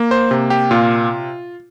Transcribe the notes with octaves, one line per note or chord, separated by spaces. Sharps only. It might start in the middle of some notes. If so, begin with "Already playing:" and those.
Already playing: A#3
C5
C3
G4
A#2 F4